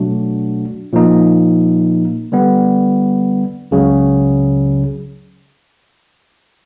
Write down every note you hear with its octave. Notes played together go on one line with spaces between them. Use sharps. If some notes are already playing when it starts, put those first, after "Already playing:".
Already playing: B2 F#3 A3 D4 F#4
A#2 F3 A#3 D#4
D3 G3 B3
C#2 C#3 F#3